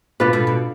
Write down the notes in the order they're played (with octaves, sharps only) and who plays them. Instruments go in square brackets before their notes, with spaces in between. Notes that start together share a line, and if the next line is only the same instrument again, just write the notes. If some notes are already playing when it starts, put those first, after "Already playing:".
[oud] B2 D3 [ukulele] D4 F4 B4
[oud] B2
B2